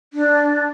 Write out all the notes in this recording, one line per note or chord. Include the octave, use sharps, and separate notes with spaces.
D4